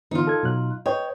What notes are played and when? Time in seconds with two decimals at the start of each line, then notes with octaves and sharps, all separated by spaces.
0.11 D3 E3 B3 D#4 F4
0.27 A4 G#6
0.43 B2 F#3 F#6
0.86 B4 C#5 D#5 G5